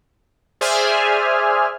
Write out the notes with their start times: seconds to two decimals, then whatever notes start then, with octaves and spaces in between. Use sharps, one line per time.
0.61 G#4 C5 D5 E5 G#5 F6